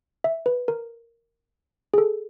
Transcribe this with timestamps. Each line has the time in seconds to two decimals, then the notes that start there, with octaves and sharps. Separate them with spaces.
0.24 E5
0.46 B4
0.68 A#4
1.94 G#4
1.98 A4